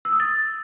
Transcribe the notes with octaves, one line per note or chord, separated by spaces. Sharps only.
E6
D#6
A6